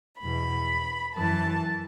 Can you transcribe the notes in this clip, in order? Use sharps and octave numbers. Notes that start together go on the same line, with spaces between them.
E2 B2 B5
F#2 E3 A5